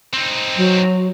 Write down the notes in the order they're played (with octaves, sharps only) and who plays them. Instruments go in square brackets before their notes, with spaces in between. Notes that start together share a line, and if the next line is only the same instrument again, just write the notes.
[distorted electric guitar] C4 D#4
[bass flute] F#3